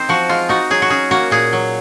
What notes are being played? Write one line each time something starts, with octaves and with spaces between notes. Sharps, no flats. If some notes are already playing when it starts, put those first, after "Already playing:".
Already playing: C4 D#4 C5
F3 F#4
G#3 F4
D#4 F#4
F#3 G#4
F#4
C#4 G#4
A#3 F#4
A#2 G#4
F#3